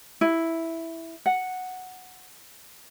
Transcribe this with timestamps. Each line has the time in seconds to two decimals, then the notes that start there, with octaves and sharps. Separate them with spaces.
0.21 E4
1.26 F#5